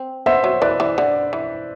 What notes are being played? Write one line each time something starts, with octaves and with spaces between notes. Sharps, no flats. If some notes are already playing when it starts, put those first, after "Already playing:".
Already playing: C4
B3 C5 E5
F#3
E3 B4 D5
E3
D3
E3